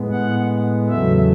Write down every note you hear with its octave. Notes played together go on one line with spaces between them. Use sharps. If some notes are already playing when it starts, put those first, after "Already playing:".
Already playing: A2 G#3 B3
F#5
E2 C#3 F#3 A3 E5